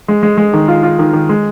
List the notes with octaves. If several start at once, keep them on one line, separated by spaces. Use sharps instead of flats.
G#3
G#3
G#3
D#3
F4
F4
D#3
D#3
G#3